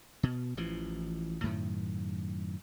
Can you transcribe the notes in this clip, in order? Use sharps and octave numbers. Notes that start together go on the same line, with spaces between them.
B2
A1 E3 F3
F#2 A2 D#3